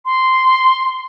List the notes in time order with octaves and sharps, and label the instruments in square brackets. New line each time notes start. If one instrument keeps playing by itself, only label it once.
[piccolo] C6